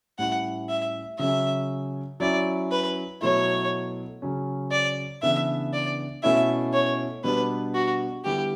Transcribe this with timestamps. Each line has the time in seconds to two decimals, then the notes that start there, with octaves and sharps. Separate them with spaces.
0.19 A2 G3 C#4 E4 F#5
0.69 E5
1.19 C#3 F#3 C#4 E5
2.20 F#3 C#4 E4 D5
2.71 B4
3.21 B2 F#3 A3 E4 C#5
4.22 C#3 F#3 C#4
4.72 D5
5.22 C#3 E3 B3 D4 E5
5.73 D5
6.23 B2 A3 C#4 E4 E5
6.73 C#5
7.24 B2 G3 B3 D4 B4
7.74 F#4
8.25 D3 G3 B3 E4 G4